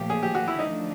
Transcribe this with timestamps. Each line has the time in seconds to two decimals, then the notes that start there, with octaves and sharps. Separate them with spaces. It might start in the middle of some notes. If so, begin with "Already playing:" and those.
Already playing: A#2 F3 A3 G4
0.10 G#4
0.23 G4
0.35 F#4
0.48 E4
0.59 D3 F3 A3 D4 D#4